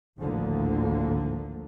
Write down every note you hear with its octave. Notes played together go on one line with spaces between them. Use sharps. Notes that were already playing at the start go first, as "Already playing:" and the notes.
G#1 D2 A2 D3 F3 A#3